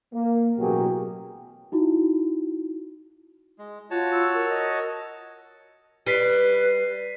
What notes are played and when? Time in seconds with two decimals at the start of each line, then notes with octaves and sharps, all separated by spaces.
0.13 A#3
0.58 A1 B2 F#3 A#3 G4 G#4
1.72 D#4 E4 F#4
3.59 G#3
3.91 F4 F#4 C#5 A5
4.12 E6
4.34 A#4
4.49 D#5
6.07 G3 B4 B6 C7 D#7